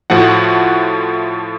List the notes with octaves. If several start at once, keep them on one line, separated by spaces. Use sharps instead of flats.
A2 F3 A3 F#4 F#5